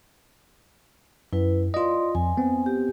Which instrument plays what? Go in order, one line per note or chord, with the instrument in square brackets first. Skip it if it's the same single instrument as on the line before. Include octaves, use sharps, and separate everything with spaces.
[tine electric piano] F#2 [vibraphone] E4 B4
[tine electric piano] F4 D#5 [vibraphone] D5 C6
[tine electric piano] F2 [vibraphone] G#5
[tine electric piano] B3 C4
[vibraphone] G4